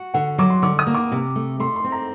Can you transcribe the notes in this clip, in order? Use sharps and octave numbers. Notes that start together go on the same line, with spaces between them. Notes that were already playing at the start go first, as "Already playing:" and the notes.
Already playing: F#4
D3 F#5
F#3 D6
C6
D3 D6
D#6
A#3
D6
C3
A3
A3 C6
C6
C4
A#5